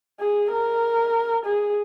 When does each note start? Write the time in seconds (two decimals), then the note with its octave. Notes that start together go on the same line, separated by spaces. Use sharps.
0.20 G#4
0.52 A#4
1.45 G#4